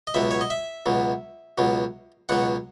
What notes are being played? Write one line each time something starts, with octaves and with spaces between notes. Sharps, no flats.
D#5
C#2 B2 F#3 E5
C#5
D#5
E5
C#2 B2 F#3
C#2 B2 F#3
C#2 B2 F#3 F#5